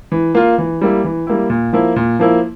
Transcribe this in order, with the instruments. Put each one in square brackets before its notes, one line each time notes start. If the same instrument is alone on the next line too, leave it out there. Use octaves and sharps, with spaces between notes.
[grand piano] E3
A#3 F4
E3
G3 A#3 E4
E3
G3 A#3 E4
A#2
F3 A#3 E4
A#2
F3 A#3 E4